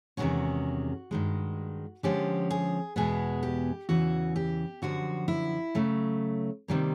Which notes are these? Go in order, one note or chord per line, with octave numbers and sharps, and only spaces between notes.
E2 C3 D#3 G#3 C#4 F#4
G2 D#3 G#3
D3 F3 G#3 C#4 G4
G#4
E2 B2 G#3 B3 G#4
G4
E2 C#3 E3 F#4
G4
F#2 D3 F3 F#4
E4
C#3 F#3 A3
C3 D#3 G3 A#3